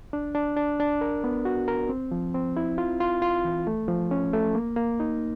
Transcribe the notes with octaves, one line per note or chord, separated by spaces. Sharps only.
D4
D4
D4
D4
A#4
B3
F#4
A#4
C4
F3
C4
E4
F4
F4
F4
E3
A3
F3
C#4
A3
A#3
A#3
D#4